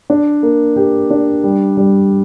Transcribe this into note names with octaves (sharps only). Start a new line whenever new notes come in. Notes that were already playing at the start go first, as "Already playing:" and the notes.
D4
A#3
G4
D4
G3
G3